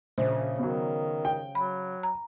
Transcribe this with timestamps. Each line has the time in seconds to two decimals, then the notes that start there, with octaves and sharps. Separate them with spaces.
0.18 A#1 C#3 C5
0.58 B2 D#3 F#3
1.25 G5
1.55 F#3 B5
2.03 A#5